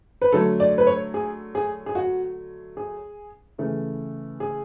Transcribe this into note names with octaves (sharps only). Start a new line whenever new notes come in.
B4
D3 F#3 A3 A4
D5
B4
C#5
G#4
G#4
G#4
F#4
G#4
C#3 E3 A3
G#4